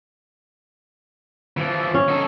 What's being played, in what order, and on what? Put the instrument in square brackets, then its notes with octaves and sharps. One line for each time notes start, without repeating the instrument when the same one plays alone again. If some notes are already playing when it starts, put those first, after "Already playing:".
[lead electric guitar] E3 F3
[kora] C#4
[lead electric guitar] D#4 A4